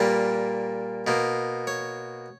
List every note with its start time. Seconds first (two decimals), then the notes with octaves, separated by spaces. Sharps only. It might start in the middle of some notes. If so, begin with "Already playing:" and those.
Already playing: A#2 G3 A#3 B4
1.07 B2 A#3
1.67 C#5